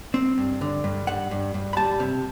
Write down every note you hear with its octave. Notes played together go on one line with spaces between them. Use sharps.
C4
G2
D3
G2
G2 F#5
G2
G2
B5
G3 A5
C3